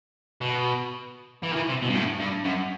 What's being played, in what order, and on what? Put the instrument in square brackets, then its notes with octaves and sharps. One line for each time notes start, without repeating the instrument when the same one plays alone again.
[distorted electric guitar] B2
E3
D#3
E3
C3
B2
G2
A2
G2
F#2